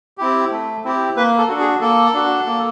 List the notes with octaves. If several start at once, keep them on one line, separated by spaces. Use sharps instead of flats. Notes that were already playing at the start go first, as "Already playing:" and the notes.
C4 E4 G4
A3
C4 E4 G4
A#3 B4
A4
D4 F#4
G#4
A#3 A4
D4 F#4
A#3